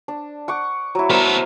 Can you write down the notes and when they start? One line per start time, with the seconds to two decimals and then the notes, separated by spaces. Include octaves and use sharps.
0.08 D4
0.48 F#5 C#6 D6
0.95 F#3 E4
1.10 B3 A4 A#4 C5 D5